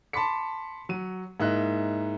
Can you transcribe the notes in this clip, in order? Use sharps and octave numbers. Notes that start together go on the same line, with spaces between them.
A5 B5 C6 D6 B6 C#7
F#3 D#7
G#2 A#3 D#4 E4 E5 F#6